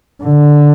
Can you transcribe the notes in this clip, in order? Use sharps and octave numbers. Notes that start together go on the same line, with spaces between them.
D3